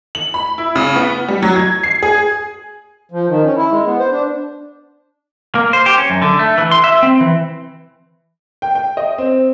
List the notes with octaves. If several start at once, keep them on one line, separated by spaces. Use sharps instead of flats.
F#7
B5
E4
C#3
B3
G3
F#3
G#6
C7
G#4
F3
D#3
C#4
E4
G#3
B3
C5
D4
A#3
C5
G4
C#4
F#2
D3
A3
E3
C6
E5
C4
E3
G5
G5
D#5
C4